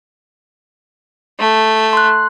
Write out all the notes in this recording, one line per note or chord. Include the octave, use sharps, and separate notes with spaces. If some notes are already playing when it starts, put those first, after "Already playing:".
A3
C6 F#6